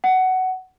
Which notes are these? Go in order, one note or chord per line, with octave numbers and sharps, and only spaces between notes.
F#5